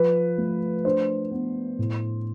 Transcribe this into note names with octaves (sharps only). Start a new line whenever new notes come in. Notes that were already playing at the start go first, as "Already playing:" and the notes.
Already playing: F3 B4
A3
D4 C5
B3
A2